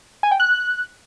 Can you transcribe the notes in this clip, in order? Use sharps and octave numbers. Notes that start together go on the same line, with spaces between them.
G#5
G5
F#6